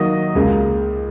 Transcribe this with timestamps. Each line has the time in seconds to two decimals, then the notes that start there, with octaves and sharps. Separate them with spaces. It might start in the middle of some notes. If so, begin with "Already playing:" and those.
Already playing: D#3 F#3 A#3 F#4 D#5
0.35 C#2 C#3 A#3